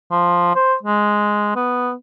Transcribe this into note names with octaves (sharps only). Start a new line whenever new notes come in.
F3
C5
G#3
B3